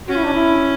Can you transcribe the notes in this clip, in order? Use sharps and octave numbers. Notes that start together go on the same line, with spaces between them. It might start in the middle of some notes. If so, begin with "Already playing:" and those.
C#4 F#4
E4
D4
E4